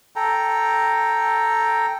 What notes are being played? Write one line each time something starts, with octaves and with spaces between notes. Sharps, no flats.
A4 G5 A#5